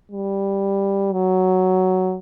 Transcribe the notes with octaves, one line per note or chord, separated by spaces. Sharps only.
G3
F#3